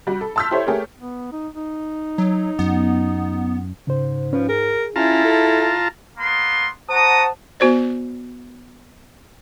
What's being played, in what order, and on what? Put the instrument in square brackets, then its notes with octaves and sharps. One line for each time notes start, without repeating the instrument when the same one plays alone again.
[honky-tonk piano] G3 F#4
A4
A5 C6 E6 F6 G6 B6
E4 G4 A4 C5 C#5
A3 G4 G#4 A#4 C#5
[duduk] B3
D#4
D#4
[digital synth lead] F#3
[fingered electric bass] F#2 [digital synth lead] B3
[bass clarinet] G#2 [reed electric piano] C#3 C5
[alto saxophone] F3 [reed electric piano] C#4 B4
[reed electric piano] G#4 [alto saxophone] A#4
[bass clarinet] C#4 [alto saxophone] E4 [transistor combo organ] F4 A5 A#5
[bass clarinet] A4
[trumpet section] A#3 B3 C6
[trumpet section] F#4 A#5 D#6 [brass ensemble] C5 F#5 A5
[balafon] B3 F#4 C5 D5